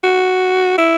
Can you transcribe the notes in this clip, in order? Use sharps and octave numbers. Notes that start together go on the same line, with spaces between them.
F#4
E4